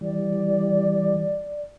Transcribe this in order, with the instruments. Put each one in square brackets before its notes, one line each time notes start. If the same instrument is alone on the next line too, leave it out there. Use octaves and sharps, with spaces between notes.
[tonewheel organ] E3 G3 [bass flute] D5